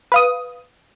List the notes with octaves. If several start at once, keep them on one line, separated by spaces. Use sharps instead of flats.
B4 F5 D#6